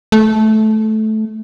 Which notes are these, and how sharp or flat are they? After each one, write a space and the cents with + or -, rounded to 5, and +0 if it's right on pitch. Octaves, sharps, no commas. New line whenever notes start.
A3 -15